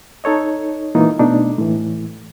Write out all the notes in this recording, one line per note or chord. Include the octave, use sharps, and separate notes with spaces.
D#4 A4 C#5 D#5
A#2 E3 G#3 A#3 D#4 F4
B2 A3 D4 D#4
A2 E3